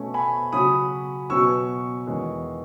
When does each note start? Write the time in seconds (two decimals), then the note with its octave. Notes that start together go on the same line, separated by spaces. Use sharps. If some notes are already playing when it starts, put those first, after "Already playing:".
Already playing: B2 A3 C#4
0.14 G#5 B5
0.52 C#3 F#3 C#4 B5 D#6
1.30 B2 F#3 C#4 C#6 E6
2.07 E2 D#3 G#3 C#4